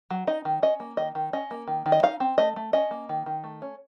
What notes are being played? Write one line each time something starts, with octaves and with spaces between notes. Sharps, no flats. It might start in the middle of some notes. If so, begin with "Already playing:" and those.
F#3
D#4 D#5
D#3
C#4 D#5
A#3
D#3 D#5
D#3
C#4 D#5
A#3
D#3
D#3
D#5
D#4 F5
C4
A3 D#5
A3
C#4 D#5
A#3
D#3
D#3
A3
C#4